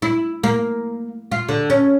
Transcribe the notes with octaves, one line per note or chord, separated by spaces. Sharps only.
E4
A#3
F4
D3
C#4